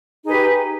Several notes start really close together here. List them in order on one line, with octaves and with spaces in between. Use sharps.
D#4 G#4 B4 G4